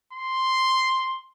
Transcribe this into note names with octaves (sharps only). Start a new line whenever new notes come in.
C6